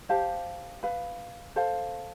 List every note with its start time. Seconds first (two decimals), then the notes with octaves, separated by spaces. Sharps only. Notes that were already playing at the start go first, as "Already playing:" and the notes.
0.09 G4 C5 F5 A5
0.83 B4 F5 B5
1.56 A4 C5 F5 A5